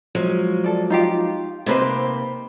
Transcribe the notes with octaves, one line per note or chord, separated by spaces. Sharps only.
F3 F#3 G#3
A4 D5
D#4 F4 G4
C3 A#3 D#4 G4 B4 C5